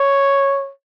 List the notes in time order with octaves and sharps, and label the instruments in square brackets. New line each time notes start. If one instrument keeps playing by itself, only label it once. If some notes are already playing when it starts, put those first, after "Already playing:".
Already playing: [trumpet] C#5